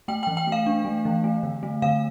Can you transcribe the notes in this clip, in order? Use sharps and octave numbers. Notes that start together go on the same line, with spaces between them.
A3 G5
E3 G5
G5
A3 F5
D4
A3
E3
A3
D3
A3
D3 F5